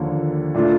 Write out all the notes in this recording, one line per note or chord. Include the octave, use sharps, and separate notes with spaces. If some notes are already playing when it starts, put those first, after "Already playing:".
Already playing: D#2 D3 F3 A#3
A#2 A3 D4 F4